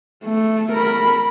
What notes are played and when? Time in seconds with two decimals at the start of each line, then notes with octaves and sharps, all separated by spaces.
0.24 A3
0.72 A#4 B5